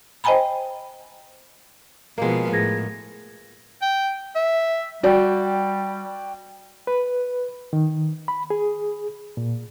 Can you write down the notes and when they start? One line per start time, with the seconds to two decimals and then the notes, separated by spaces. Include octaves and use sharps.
0.24 C5 D#5 G5 G#5 A#5 B5
2.18 B2 F3 G#3 A#3 B3
2.52 A2 G#4 G#6 A#6
3.82 G5
4.35 E5
5.03 G3 F#4 D5 G5
6.87 B4
7.73 D#3
8.28 B5
8.50 G#4
9.37 A#2